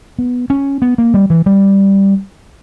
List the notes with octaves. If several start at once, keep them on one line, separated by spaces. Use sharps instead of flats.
B3
C#4
B3
A#3
G3
E3
G3